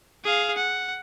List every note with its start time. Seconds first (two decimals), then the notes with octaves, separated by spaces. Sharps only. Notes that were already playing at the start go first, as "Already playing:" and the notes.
0.24 G#4 F5
0.56 F#5